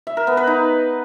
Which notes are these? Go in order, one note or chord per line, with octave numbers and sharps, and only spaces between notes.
E5
A#4
B3
B4
D#4